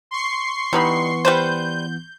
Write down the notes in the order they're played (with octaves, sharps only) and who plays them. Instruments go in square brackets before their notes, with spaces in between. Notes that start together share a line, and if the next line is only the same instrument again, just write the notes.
[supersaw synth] C6 C#6 C7
[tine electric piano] E3 B3 [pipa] G3 D#4 B5
[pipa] G3 B4 C5 [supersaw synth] G6